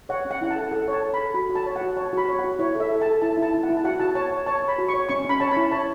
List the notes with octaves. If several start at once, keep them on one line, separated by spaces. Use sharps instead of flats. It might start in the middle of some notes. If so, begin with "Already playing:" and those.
C#5 F#5
C#4
F#5
E4 F#5
A5
A4
A4 F#5
C#5 A5
C#5
B5
A4
F#4 B5
F#4
A5
C#5
F#5
F#4
C#5 A5
F#4 B5
C#5
F#5
F#4
E4 C#5
A4 E5
A4
A5
A4
E4 A5
E4
A5
E4
F#5
E4
A5
F#4 F#5
F#4 A5
C#5 A5
C#5
C#5 A5
C#5
B5
F#4
C#6
C#5
C#4 C#6
C#4 B5
C#5 A5
B5
E4
C#5 A5